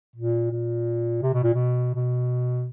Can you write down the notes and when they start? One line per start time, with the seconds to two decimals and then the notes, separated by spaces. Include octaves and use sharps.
0.16 A#2
0.51 A#2
1.22 C3
1.33 B2
1.44 A#2
1.54 B2
1.95 B2